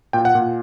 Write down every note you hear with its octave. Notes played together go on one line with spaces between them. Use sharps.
A#2 G5
F#5
A#2